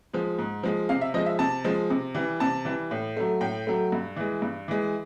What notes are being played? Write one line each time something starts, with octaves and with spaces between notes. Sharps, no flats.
F3 G#3
G#2
F3 G#3
C3 F5
E5
F3 G#3 D#5
E5
C3 A5
F3 G#3
C3
E3 G3
C3 A5
E3 G3
A2
F#3 A3
A2 G5
F#3 A3
G2
E3 G#3
G2
E3 G#3